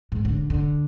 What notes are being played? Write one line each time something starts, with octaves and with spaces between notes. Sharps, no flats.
G#2
D3
D3